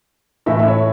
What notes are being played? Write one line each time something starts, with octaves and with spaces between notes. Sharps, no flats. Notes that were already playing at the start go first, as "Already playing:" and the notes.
A2 E3 E5
E5
C#5